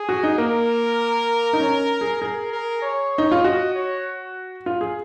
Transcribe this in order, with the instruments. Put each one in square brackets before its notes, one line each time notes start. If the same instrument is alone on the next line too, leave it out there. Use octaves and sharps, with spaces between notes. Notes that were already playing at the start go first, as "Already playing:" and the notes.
Already playing: [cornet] G#4
[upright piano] F#4
D#4
[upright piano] A#3 [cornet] A#4
[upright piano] D#4
C#4
G#4
[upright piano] G#4 [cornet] A#4
[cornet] A#4
C#5
[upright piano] D#4
F4
[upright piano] F#4 [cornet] D#5
[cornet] C#5
[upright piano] F4
G#4